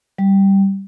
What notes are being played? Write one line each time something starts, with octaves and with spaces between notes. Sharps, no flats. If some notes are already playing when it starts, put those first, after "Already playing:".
G3